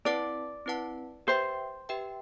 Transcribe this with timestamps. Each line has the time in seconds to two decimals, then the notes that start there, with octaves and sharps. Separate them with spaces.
0.05 C4 E4 B4 D5 F#5 A5
0.66 C4 E4 B4 F#5 A5
1.27 G4 B4 C5 E5 G5
1.89 G4 B4 E5 G5